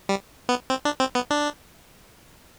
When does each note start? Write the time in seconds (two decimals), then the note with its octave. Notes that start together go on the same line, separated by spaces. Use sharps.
0.09 G3
0.49 B3
0.70 C4
0.85 D4
1.00 C4
1.15 B3
1.30 D4